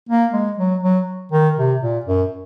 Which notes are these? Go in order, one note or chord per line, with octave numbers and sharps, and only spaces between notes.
A#3
G#3
F#3
F#3
D#3
C3
A#2
F#2